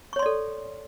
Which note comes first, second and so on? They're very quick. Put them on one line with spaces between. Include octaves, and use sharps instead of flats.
C#6 C#5 C6 D5 A4